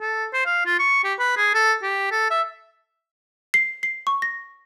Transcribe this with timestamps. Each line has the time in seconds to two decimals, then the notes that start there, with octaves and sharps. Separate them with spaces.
0.01 A4
0.33 C5
0.46 F5
0.66 F4
0.79 C#6
1.04 G4
1.19 B4
1.37 G#4
1.54 A4
1.83 G4
2.11 A4
2.30 E5
3.54 C7
3.83 C7
4.07 C#6
4.22 A#6